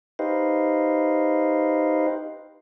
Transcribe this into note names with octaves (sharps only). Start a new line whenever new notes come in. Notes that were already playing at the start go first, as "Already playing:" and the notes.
D#4 G4 B4 C5 D#5 F5